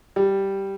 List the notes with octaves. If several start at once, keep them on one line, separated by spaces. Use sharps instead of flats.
G3